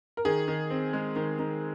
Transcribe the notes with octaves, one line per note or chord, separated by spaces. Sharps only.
A#4
D#3 G#4
D#3
C4
G#3
D#3
D#3